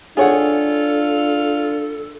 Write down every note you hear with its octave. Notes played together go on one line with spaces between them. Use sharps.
D4 F4 G#4 A4 C#5 F#5